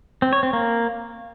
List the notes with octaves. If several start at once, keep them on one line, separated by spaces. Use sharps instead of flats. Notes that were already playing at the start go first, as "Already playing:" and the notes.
C4
C#5
C4
A#3